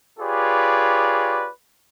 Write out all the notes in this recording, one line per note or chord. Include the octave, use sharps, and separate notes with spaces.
F4 G4 G#4 B4 C#5 D5